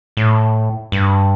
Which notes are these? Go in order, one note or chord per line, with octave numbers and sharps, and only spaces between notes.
A2
G2